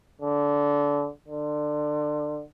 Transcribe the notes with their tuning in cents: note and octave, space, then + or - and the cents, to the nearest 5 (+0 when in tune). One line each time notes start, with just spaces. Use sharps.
D3 -20
D3 +25